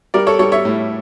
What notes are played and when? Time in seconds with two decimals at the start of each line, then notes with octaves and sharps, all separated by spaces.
0.14 G3 A#4 D5
0.27 A4 C#5
0.39 G3 A4 C#5
0.52 C#5 E5
0.65 A2